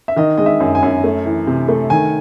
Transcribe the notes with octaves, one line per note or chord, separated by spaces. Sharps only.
E5
D#3 D#5
G#3 D#5
E5
F#2
G#5
F#2
A3
E3
C3
A3
D#3 G#5